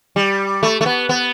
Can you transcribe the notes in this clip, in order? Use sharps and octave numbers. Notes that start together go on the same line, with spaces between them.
G3
A3
A3
B3
B3